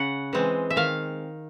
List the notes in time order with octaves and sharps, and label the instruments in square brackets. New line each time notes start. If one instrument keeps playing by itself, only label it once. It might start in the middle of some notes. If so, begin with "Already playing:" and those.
Already playing: [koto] C#3 F#5
E3 G#3 C4
E5
D#3 F5